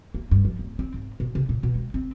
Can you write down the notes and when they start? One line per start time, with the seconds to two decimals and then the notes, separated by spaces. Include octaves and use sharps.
0.14 A#3
0.31 G2
0.45 F3
0.59 D1
0.79 C4
0.94 G#2
1.20 B2
1.35 C#3
1.49 A#2
1.63 B2
1.75 G#3
1.94 C4